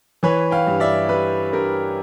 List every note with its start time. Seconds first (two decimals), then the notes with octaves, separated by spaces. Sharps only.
0.23 E3 B4 C#5
0.51 F5 G5
0.67 G2
0.80 D5 E5
1.09 G3 B4
1.52 G2 A#4